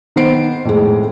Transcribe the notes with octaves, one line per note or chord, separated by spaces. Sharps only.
D#3 B3 C5 C7 D7
F2 A2 G#3